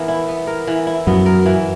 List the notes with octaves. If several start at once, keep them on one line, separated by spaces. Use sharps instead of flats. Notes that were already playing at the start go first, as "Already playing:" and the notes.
Already playing: E3 B3 A#4
E4
B3
A#4
E3
E4
F#2 F#3 B3
A#4
E3